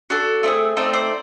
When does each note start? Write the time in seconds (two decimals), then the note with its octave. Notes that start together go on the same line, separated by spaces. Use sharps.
0.10 D4 F#4 A4
0.43 A3 C4 D#4 G#4
0.77 A3 C4 D#4 C5 D5
0.93 C5 D5